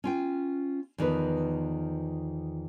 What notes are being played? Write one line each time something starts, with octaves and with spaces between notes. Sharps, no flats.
C#4 F4 G5
E2 D#3 F3 B4